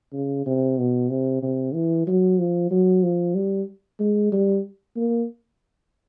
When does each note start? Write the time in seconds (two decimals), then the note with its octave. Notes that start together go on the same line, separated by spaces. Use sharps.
0.13 C#3
0.46 C3
0.78 B2
1.09 C3
1.43 C3
1.74 E3
2.07 F#3
2.38 F3
2.71 F#3
3.03 F3
3.35 G3
4.00 G#3
4.32 G3
4.96 A#3